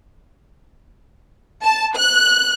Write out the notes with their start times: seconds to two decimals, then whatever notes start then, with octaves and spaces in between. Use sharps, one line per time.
1.62 A5
1.95 F#6